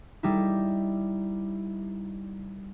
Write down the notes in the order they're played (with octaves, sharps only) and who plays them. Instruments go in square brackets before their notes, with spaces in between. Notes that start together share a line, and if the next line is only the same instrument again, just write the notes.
[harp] G3 D#4 E4